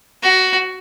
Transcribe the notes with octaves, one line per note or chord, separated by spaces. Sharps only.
F#4